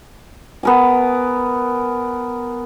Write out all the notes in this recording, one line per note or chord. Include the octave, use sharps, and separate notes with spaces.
B3 A#4 G#5